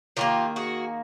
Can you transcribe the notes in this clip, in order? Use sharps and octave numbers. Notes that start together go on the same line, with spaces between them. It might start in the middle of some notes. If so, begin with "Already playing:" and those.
D#3 G3 A#3 F4 G4
F#4 G#4